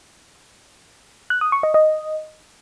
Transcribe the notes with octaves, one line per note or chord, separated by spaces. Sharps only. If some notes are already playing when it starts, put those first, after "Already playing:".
F#6
D#6
C#6
D#5
D#5